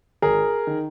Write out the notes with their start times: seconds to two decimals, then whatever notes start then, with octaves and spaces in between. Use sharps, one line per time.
0.22 G#1 G#4 A#4
0.67 D#3